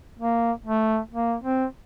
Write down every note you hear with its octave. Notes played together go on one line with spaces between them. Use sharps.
A#3
A3
A#3
C4